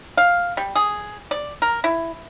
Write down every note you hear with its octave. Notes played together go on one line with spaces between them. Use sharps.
F5
G3
G#4
D5
A#4
E4